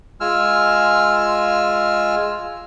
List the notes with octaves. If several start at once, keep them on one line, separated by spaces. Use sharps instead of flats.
G#3 F4 G#5 E6 F6